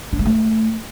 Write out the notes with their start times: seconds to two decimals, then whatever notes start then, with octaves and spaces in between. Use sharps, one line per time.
0.13 D4
0.19 G#3
0.25 A3